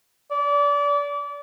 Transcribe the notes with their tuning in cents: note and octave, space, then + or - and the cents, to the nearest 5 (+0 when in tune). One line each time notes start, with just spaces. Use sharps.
D5 -30